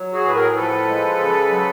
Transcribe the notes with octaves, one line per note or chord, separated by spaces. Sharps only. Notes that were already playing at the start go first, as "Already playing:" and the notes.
Already playing: F#3
F#4 G#4
A2 B4
G#4 A#4
F3 A4 B4
G#3
C#3
F#3